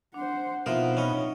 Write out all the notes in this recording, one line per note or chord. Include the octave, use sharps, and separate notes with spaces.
D4 C5 F#5
B2 F3 C4 D#4 A#4 E5 F#5
C#4 D#4 C#5 D#5 B5